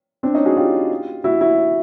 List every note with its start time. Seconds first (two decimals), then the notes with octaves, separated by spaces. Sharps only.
0.23 C4 D4
0.34 C#4 D#4
0.46 F#4 G#4
0.57 F4 G4
1.24 E4 F#4
1.41 E4 F#4